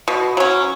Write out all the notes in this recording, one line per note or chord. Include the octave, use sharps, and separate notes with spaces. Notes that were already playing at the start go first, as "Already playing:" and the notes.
B2
F#3 C#4